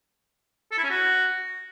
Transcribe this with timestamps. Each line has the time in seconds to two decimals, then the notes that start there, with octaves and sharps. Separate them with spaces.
0.71 A4
0.78 E4
0.84 C#4
0.90 F#4